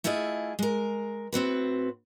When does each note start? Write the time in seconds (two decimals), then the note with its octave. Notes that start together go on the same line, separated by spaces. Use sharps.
0.04 A3 E4 F4 G#4 D#5
0.59 G#3 A#4
1.32 A2 C4 F#4 B4